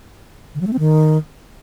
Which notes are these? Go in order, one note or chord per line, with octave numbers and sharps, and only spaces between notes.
D3
F#3
A3
C4
D#3